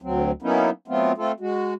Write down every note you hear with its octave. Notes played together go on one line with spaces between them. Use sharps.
D2 F#3 C4
F#3 A#3 B3 C#4 D#4 E4
F#3 A3 B3 C4 F4
A3 C4 F4 A4
G#3 F#4